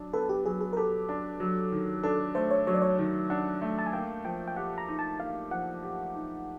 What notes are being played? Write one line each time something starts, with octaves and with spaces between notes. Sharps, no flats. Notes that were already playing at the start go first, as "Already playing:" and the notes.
Already playing: F#3 D4
B3 A4
G4
F#3 G#4
G#4
A#4
G4 A4
D4
F#3
D#3
D4 A4
A3 C5
C#5
F#3 C#5
D5
C#5
D#3
D4 F#5
A3
A5
G#5
A#3 G5
F3 G5
G5
G4 F#5
A#5
D#4
A5
A#3 F5
F3 F#5
G4
D#4